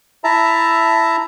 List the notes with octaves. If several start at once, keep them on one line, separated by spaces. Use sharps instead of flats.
E4 E5 A5 A#5